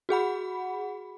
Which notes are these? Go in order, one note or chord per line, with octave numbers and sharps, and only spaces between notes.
F#4 G#4 F#5 B5